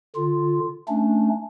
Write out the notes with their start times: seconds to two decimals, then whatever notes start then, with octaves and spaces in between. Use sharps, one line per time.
0.15 D3 F4
0.88 A3 C#4 D4